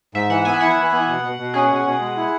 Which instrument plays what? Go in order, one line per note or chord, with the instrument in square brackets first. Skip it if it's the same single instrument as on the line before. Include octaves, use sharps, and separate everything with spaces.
[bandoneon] G#2 [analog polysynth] E5
[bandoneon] E3 [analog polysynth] F#5
[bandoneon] B3 [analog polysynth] G#5
[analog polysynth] E5
[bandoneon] E4 [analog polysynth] F#5
[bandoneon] E3
B3
B2
B2
B2
[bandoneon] C#4 [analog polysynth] G#4
[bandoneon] B2
B2
G#3
E4